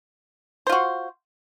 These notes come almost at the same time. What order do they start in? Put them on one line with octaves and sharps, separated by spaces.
C5 F4 F#4